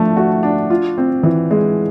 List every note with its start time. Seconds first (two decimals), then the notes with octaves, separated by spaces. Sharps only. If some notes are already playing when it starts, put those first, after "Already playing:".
Already playing: F3 A3 D4
0.17 F#4
0.43 D4
0.70 F4
0.98 C4
1.23 E3
1.51 G#3